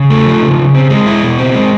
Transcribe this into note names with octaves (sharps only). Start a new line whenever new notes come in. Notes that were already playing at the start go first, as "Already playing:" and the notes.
Already playing: C#3
A3
F3
C#3
C#3
C4
G#3
E4
B2
C4
G#3